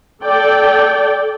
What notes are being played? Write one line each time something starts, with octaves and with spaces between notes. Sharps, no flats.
A4 D5 G5